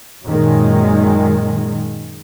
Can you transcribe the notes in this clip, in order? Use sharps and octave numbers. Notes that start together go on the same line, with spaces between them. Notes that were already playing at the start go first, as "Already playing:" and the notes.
F#2 A#2 D#3 G#3